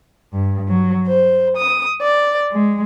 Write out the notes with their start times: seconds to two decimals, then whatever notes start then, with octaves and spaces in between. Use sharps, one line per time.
0.33 G2
0.69 F#3
1.07 C5
1.57 D#6
2.02 D5
2.52 G#3